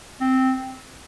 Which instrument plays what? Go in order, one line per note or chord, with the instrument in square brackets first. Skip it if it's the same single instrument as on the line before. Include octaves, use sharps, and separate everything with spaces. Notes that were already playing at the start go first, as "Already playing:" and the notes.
[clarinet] C4